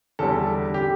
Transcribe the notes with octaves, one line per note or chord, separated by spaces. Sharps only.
E2 D3 G3 A4
G4